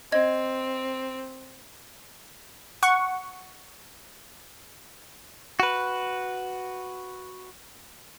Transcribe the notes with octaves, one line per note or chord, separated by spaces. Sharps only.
C4 D#5 G#6
F#5 C#6
F#4 B4